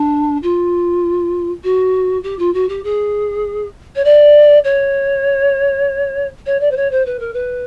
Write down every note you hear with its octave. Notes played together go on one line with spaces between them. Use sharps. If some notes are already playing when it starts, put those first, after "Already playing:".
Already playing: D4
F4
F#4
G4
F4
F#4
G4
G#4
C#5
D5
C#5
C#5
D5
C5
C#5
C5
B4
A#4
B4